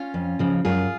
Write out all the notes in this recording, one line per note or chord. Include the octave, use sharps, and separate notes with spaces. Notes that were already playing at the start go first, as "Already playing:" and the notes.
Already playing: C#4 F4
F2
C#3 F3
F#2 F4 G#4